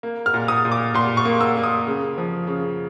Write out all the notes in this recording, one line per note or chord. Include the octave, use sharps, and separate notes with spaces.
A#3
F6
A#2
D#6
A#2
D6
A#2 C6
C#6
A#3
E6
A#3
D#6
C#3
F3
C#3